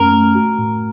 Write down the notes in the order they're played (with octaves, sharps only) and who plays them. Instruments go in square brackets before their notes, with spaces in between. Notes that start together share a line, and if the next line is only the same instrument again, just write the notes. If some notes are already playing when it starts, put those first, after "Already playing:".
Already playing: [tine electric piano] F#2 A3 C#4 [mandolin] A#4
[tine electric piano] A3
F#4
A2